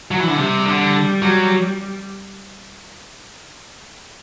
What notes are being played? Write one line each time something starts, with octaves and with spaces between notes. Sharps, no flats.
F#3
E3
D3
C3 G3
D3
F#3